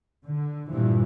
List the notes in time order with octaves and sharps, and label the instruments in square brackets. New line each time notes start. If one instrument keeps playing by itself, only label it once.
[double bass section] D3
G2 A#2 E3 F3